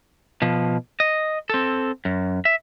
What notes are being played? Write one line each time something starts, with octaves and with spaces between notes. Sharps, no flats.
B2 F3
D#5
C4 A4
F#2
E5